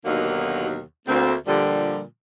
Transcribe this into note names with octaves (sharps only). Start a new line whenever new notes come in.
D#2 B2 D3 F#3 A#3 D#4
D2 A#3 C4
A#2 D3 F3 G3